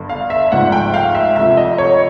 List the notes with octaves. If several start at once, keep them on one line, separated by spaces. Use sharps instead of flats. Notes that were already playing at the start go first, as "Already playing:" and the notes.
Already playing: G1 G2 D3
F5
E5
G#1 G#2 F3 A3 F#5
G5
F5
E5
D2 C3 F3 E5
D#5
C#5